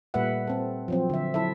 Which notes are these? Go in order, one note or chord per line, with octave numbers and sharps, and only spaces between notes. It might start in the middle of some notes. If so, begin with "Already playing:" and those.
A#2 G3 A3 B4 E5 F#5
C4 A4
F3 F#3 C4
D3 E5
F#3 E4 A4 E5